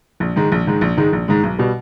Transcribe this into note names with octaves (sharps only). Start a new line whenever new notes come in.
A#1
G#2 D#3 G#3
A#1
G#2 D#3 G#3
A#1
G#2 D#3 G#3
A#1
G#2 D#3 G#3
B1
B2 G3